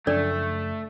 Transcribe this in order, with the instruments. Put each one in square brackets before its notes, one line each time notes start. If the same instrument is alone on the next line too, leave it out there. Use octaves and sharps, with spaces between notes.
[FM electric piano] F#2 C#3 F3 [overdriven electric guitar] A3 [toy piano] D4 A4 D5